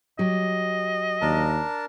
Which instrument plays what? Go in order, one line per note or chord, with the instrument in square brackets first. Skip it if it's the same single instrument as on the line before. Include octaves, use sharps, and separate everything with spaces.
[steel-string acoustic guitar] F#3 G4 [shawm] D#5
[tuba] D#2 [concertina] D4 A#4 A5